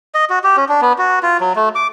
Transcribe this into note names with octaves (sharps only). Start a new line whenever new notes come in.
D#5
F#4
G4
C#4
D4
B3
F#4
F4
F#3
A3
D6